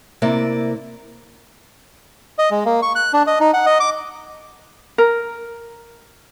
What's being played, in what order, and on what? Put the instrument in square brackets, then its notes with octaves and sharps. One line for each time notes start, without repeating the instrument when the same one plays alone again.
[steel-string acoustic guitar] C3 A#3 E4 D5
[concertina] D#5
G#3
A#3
C#6
F#6
D4
D#5
D#4
F#5
D#5
D6
[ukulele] A#4